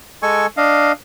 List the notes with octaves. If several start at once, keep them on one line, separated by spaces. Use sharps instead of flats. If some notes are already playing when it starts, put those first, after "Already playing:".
G#3 A4 G#5 C#6
D4 D#5 F5